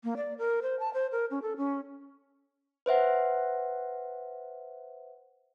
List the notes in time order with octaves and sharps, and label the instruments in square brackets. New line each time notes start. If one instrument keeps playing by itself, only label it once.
[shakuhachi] A#3
D5
A#4
C5
A5
C5
A#4
C#4
A4
C#4
[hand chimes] B4 C5 E5 F#5